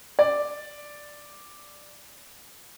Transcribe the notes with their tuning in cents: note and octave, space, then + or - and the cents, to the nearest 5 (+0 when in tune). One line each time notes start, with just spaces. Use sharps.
D5 +0